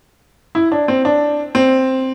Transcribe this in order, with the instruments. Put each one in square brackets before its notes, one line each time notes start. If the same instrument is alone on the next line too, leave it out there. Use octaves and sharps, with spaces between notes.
[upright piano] E4
D4
C4
D4
C4